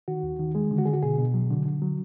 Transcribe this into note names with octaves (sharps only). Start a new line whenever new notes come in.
D#3 F#4
D#2
D#3
G#3 G#4
D3
F#4
D3 G#4
F#4
B2 G#4
B2
F#3
D3
D3
F#3